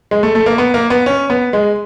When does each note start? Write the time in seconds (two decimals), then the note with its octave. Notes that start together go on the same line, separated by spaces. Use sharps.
0.11 G#3
0.23 A3
0.35 A3
0.46 A#3
0.58 B3
0.74 A#3
0.90 B3
1.06 C#4
1.30 B3
1.53 G#3